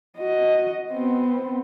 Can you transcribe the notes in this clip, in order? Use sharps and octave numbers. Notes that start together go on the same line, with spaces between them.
F#4 D#5
B3 C4